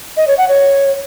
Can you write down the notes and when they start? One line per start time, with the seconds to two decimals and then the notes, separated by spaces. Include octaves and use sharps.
0.17 D#5
0.27 C#5
0.38 F#5
0.48 C#5